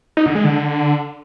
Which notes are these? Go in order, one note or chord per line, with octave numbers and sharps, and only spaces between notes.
D#4
D3
G#3
D3